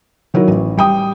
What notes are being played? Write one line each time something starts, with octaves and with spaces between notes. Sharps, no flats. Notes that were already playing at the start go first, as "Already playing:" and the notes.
D#3 F#3 E4 A#4
A1
G3 G5 D#6